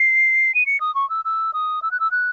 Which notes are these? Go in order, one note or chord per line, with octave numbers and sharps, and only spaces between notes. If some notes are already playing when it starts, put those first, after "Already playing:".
Already playing: C7
D#7
C#7
D#6
C#6
E6
E6
D#6
E6
F#6
E6
F#6